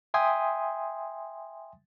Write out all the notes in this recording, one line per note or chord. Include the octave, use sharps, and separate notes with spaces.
E5 G5 G#5 C6 D#6